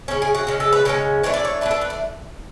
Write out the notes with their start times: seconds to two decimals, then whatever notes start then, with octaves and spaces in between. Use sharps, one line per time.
0.08 C#3 G#3 C#4 C#5
0.22 G#4
0.35 F#4
0.47 C#3 G#3 C#4
0.60 A4
0.73 B4
0.85 C#3 G#3 C#4 C#5
1.23 E3 A3 D4 C#5
1.34 D5
1.45 C#5
1.61 E3 A3 D4 B4
1.71 A4
1.81 B4
1.90 D5